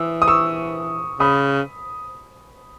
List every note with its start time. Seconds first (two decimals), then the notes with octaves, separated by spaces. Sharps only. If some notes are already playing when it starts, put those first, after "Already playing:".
Already playing: E3 D#6 E6
0.22 D#6
0.27 C#6 E6
1.20 C#3 B5 D#6